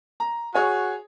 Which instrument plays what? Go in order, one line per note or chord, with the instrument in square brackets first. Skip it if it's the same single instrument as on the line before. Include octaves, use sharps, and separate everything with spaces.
[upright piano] A#5
[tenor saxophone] F#4 [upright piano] G#4 C#5 G#5